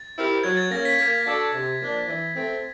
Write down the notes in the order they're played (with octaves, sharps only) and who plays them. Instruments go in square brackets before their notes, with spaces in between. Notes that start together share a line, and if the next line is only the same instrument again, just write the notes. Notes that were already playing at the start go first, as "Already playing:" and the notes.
Already playing: [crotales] A6
[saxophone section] C4 E4 G4 A#4
[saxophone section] F#3 [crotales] G#6
[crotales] A6
[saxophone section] A#3 C#4 [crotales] A#6
[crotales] B6
[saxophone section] A#3 [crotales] B6
[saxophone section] D4 F#4 A4 D5
C3
F3 A#3 D4
E3
A3 C4